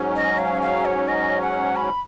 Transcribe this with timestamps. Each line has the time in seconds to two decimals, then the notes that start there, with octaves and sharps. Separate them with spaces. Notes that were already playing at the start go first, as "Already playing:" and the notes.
Already playing: G#2 F#3 C#4
0.16 D#5
0.39 F5
0.62 F5
0.85 C#5
1.08 D#5
1.41 F#5
1.76 B5